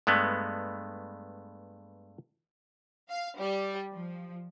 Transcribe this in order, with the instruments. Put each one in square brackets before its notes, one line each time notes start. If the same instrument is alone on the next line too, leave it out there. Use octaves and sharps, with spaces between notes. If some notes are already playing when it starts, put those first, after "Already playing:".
[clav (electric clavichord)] G2 G#3 A3 B3
[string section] F5
G3
F3